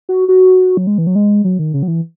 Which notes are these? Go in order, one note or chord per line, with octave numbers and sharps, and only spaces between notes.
F#4
F#4
F#3
G#3
E3
F#3
G#3
F#3
D#3
C#3
F#3
E3